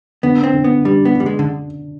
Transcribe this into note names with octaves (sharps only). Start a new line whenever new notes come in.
D3 B3
C4
D3
B3
G3 D4
B3
G3 D4
G#3
D3